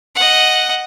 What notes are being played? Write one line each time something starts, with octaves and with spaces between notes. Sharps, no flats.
D#5 F#5